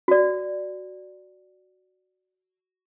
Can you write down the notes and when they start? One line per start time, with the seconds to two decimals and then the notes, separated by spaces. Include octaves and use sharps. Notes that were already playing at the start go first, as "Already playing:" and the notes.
0.08 F#4 D5